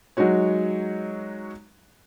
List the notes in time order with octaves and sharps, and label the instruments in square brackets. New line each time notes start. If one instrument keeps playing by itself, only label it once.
[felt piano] F#3 G#3 D#4 F#4 C#5